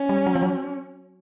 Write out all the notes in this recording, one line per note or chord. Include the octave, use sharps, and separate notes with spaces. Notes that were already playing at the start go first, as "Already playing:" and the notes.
Already playing: C#4
G3
F#3
F3
F#3